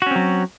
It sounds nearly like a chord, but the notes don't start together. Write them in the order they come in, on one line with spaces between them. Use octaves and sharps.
F#4 C#4 C4 F#3